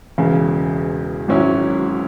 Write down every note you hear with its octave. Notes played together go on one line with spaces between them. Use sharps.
E1 E2 C#3
G#1 G#2 F#3 C#4 E4